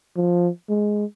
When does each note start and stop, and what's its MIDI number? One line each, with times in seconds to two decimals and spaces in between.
0.17 0.49 53
0.69 1.05 56